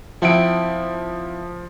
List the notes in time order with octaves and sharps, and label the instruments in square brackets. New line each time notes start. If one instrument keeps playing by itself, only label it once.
[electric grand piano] F3 D7 [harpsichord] C4 E4 F#5